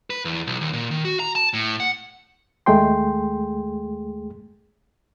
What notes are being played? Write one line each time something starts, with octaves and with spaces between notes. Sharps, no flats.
B4
E2
B1
D#2
A#2
D#3
F#4
A#5
A5
A2
F#5
D#2 G#3 A3 G#4 G5 C6